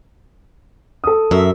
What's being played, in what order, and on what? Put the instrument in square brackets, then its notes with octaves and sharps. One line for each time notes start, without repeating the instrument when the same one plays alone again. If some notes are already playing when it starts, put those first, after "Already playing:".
[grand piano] A4 D#6
[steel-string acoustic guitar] F#2 E5